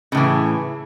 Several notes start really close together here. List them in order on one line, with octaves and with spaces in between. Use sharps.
C#3 A2 E3